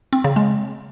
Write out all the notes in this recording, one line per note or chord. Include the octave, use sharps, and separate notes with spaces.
C4
C#3
G#3